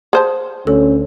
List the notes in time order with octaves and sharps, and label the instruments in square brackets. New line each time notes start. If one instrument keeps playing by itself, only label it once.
[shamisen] G#4 C5 A5
[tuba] D2 [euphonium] C#4 [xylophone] A4